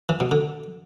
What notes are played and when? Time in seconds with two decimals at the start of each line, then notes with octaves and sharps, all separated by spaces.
0.09 E3
0.20 B2
0.31 D3